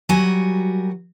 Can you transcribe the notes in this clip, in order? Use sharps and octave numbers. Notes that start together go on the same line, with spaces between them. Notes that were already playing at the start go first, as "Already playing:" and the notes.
F#3 G3 F#4 A#4 F#5 G#5